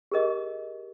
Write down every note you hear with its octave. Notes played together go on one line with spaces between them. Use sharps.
G4 G#4 A#4 D#5